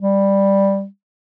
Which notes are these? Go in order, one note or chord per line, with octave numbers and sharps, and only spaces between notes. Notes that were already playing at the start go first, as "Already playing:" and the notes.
G3